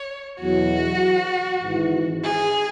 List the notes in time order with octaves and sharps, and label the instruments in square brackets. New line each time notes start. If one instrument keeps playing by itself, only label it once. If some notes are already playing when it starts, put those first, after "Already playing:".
Already playing: [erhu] C#5
[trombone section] E2 B2 F#3 [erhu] F#4
[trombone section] G#1 G#2 E3
[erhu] G#4